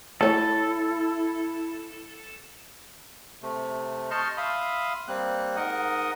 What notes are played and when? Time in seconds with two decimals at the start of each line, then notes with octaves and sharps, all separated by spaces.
0.21 A3 E4 A4 C#5
3.42 C3 A3
4.11 D#5 A5 C6 C#6 F6 G6
4.37 E5 F5 B5 C6 D#6
5.08 G3 A#3 C4 F#6
5.56 G#2 A#4 D#5 F#5 D#6